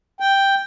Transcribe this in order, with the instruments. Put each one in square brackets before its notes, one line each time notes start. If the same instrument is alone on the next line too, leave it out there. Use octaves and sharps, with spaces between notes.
[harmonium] G5